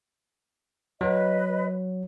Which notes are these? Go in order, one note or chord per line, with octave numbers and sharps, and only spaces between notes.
F#3 B4 D#5